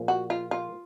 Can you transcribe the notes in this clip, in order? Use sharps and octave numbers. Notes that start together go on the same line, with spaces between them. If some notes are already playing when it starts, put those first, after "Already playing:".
Already playing: A#2 F3 A#3 G#4
F#4
F4
F4